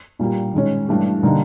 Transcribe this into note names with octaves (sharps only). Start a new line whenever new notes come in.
A#2 G3 A#3
D#3 G#3 C#4
G2 E3 A3 D4 G4
D3 G3 A#3 D#4